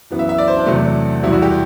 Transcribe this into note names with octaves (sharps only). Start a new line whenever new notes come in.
F#2 E3 B3
E5
E5
D5
C5
D4
E2 C3 F#3 A3
E2 B2 G3 E4
F#4
G4